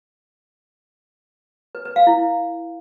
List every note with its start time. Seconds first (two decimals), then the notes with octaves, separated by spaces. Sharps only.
1.75 B4
1.85 B4
1.96 F5
2.07 E4